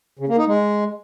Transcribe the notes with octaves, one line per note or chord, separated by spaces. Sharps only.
C#3
A#3
D#4
G#3